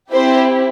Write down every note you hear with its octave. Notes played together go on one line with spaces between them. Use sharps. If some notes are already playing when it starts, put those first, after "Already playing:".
C4 E4 G4 C5